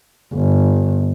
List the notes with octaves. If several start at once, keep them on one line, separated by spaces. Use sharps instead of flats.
G1